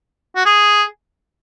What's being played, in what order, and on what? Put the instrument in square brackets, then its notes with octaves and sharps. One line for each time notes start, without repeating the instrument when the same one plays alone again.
[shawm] F#4
G#4